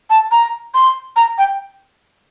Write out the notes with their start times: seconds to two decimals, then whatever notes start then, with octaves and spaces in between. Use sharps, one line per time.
0.10 A5
0.31 A#5
0.74 C6
1.16 A#5
1.38 G5